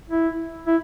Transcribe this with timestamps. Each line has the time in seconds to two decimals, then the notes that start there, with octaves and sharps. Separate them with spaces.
0.09 E4
0.67 E4